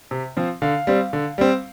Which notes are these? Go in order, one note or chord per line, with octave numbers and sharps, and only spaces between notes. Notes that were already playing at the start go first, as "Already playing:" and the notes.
C3
F3 C4
D3 F5
G3 C4
D3
G3 C4